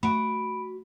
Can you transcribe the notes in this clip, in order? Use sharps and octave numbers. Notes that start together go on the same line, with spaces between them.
A3 F#4 B5 D7